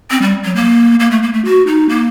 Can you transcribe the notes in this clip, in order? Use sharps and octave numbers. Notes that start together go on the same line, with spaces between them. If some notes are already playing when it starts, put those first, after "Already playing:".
C4
G3
F#3
A#3
A#3
A3
A#3
A3
F#4
D#4
A#3